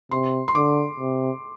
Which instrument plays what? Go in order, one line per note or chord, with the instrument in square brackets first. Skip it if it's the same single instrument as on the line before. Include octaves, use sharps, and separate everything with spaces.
[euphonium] C3 [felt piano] C6
[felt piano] C6
[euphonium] D3 [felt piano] D6
[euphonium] C3